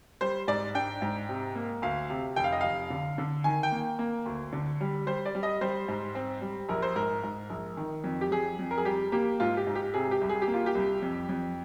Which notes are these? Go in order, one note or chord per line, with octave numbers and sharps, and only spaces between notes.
G3 C5
G#2 D5
D4 G5
G#2
C3
A#3
D2 F5
C3
F1 G5
F5
D#5
F1 F5
D3
D3
D#3 G#5
G5
A#3
A#3
D2
D3
G3
G3 C5
D5
G3
D#5
G3 C5
G#2
C4
G3
A#1 A#4
C5
G#2 A#4
G#2
A#1
D#3
F2
G4
F2 G#4
F2
A#4
G#4
G3 G4
A#3 G4
G#2 F4
G4
G#2
G4
C3 G#4
G4
C2
G#4
G4
A#3
F4
G4
C2
F2
F2